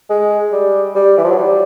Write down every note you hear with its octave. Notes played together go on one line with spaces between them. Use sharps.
G#3
G3
G3
E3
F3
F#3
G3